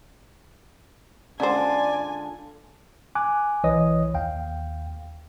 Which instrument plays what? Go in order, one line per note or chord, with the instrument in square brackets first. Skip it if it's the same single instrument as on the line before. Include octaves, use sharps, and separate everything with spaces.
[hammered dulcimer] D3 G#3 F4 [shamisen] C#4 C5 [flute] D5 [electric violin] G#5
[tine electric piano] G#5 D6 F#6
B1 E3 B4 C#5 D#5 D#6
D#2 F5 G5